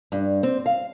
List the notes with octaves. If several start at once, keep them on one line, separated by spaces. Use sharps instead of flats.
G2
C4
F5